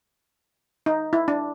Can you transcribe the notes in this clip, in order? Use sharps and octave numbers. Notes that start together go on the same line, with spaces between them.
D#4
E4
D4